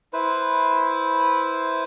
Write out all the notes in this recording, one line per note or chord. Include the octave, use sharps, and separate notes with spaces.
E4 B4 C5